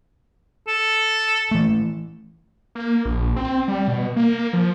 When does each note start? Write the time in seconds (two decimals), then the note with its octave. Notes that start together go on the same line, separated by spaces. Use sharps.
0.68 A4
1.51 E3 A3
2.75 A#3
3.05 A#1
3.36 C4
3.68 G3
3.88 B2
4.16 A#3
4.53 F3